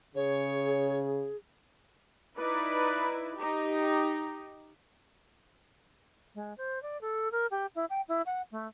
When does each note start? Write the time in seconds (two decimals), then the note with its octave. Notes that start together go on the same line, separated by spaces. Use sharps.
0.15 C#3 G#4 C#5
2.37 D#4 E4 B4 D5
3.37 D#4 G4
6.35 G#3
6.58 C5
6.83 D5
7.01 A4
7.32 A#4
7.51 G4
7.75 E4
7.90 G5
8.08 E4
8.26 F#5
8.52 A3